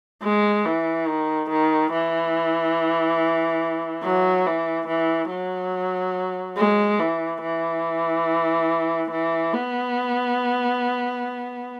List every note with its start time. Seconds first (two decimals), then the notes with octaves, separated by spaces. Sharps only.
0.23 G#3
0.66 E3
1.08 D#3
1.50 D#3
1.93 E3
4.04 F#3
4.46 E3
4.88 E3
5.31 F#3
6.57 G#3
7.00 E3
7.42 E3
9.11 E3
9.53 B3